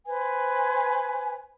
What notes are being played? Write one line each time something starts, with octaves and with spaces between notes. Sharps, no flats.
B4 C5 G#5